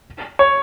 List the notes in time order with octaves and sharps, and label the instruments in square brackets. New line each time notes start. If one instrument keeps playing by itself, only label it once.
[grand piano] C#5